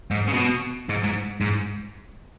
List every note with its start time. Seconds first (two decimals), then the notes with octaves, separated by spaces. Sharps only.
0.11 G#2
0.28 C#3
0.33 B2
0.89 G#2
1.04 G#2
1.41 G#2